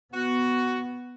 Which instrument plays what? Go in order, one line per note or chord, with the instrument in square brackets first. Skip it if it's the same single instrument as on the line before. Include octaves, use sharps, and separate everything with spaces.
[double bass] B3 [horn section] F#4